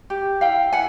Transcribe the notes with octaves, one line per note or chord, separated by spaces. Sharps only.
G4
E4 F5 G5
E4 F#5 G#5